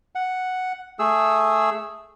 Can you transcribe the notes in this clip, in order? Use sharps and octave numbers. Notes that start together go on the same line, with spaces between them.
F#5
A3 G#4 E6